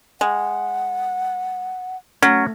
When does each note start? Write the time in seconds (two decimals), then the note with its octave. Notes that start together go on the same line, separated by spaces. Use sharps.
0.21 G#3 F#5
2.22 F#3 A3 C#4